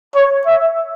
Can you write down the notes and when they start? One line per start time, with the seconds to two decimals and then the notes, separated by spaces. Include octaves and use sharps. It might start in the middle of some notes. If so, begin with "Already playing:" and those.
0.15 C#5
0.46 E5